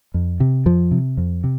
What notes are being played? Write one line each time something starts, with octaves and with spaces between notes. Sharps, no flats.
F2
C3
F2 F3
C3
F2
C3